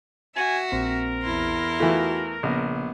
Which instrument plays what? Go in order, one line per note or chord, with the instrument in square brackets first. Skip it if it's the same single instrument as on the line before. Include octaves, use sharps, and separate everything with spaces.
[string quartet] F#4 E5 [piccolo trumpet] G#5
[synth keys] A#1 C4 A#6 [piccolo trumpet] A#4
[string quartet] E2 E4 C6
[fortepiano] E3 A3 [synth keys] F4 F#4
[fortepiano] A#1 [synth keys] C#3 [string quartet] B3